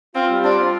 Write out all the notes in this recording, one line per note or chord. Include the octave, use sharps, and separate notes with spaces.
C4 F4
G3
C4 D4
F4